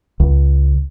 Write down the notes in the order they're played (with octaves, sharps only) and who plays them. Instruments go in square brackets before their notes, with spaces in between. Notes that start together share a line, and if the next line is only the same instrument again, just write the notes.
[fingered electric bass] C#2